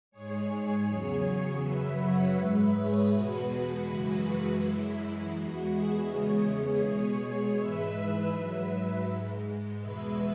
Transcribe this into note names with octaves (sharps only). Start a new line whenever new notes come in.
G#2 G#3 G#4 C#5
E2 C#3 F#3
F#2 C#3 F#3 B4 E5
C#5 F#5
G#2 G#3 B4 E5
G#4 C#5
E2 B2 G#3 F#4 B4
F#2 C#3 E3 G#3
F#2 E3 G#3 E4
E2 E3 G#3 F#4
E4 G#4
E2 C#3 E3 G#3 G#4 C#5
B2 G#3
G#2 E3 G#3 B4 E5
G#2 F#3
G#2 G#3
E2 B2 G#3 B4 E5